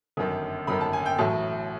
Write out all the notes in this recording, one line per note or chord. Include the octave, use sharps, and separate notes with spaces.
G1 F#2 D#3
G1 F#2 D#3 B5
A5
G#5
G5
A1 A2 F#3 A5